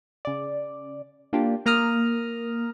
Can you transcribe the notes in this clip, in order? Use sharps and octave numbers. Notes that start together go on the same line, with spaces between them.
C#3 D5
A#3 D4 F4 G4
A#3 A#5 D#6 F6